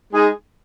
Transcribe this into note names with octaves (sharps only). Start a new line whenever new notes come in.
G#3 D#4 G#4